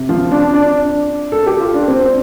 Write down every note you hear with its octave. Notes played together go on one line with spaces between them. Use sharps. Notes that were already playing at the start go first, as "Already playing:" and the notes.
Already playing: C3
F3 F4
D4
D4 D5
A4
G4
F4
D4
C4